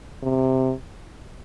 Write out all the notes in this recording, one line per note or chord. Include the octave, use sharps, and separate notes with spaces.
C3